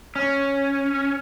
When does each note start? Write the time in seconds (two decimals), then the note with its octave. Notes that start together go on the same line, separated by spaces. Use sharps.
0.16 C#4